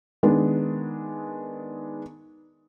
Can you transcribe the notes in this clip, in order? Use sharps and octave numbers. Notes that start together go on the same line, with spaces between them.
D#3 G#3 B3 D4